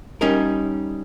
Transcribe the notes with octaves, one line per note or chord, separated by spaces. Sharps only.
G3 C#4 D#4 A#4